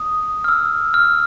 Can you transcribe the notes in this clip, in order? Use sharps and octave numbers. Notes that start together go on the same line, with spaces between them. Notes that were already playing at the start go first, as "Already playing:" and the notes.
Already playing: D#6
F6
E6
F6